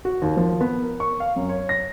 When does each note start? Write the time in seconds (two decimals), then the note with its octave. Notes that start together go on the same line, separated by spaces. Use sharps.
0.05 F#4
0.22 D#2
0.37 F3
0.61 B3
0.82 A#4
1.00 C#6
1.20 F5
1.36 F#2
1.49 C#5
1.69 A#6